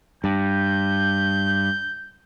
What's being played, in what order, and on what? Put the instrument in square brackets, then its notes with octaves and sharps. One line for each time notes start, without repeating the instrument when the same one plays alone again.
[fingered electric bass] G2 [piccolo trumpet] G6